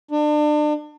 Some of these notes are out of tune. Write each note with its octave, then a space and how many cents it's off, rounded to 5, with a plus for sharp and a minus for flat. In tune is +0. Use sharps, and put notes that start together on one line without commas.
D4 +35